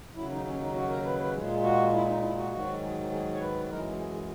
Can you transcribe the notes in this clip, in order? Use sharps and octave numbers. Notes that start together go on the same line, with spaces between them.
D#2 C#3 F#3 E4
D#4
C#4
D#4
F#4
A#4
B4
B4
A#2 G#3 G#4
F#4
E4
D#4
E4
F#4
G#2 D#3 F#3 F#4
G#4
G#4
C#5
B4
F#2 E3 G#3 A#4
G#4
G#4